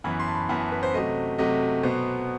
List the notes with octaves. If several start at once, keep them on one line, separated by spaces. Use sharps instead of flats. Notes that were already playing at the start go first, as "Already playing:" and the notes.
F#2 E3 B3 B5
C6
A5
B5
F#2 E3 B3 B5
A5
B4
C5
C3 F#3 A3 D#5
C3 F#3 A3 D#5
B2 F#3 B3 C5